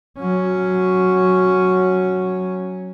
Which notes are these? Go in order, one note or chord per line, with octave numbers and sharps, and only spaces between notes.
F#3 C#4